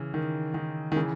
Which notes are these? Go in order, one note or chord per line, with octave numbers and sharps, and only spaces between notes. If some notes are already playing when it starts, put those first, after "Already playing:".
Already playing: C#3 E3
D#3
D#3
D#3
C#3 E3